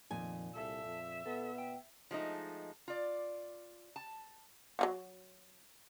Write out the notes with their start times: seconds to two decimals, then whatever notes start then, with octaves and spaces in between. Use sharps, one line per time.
0.11 F2 A#2 D#3 G#5
0.55 C2 A4 E5
0.85 F2
1.26 B3 A4
1.58 G5
2.11 F3 G#3 A3 D#4
2.88 F4 D5
3.96 A5
4.79 F#3 F4 F#4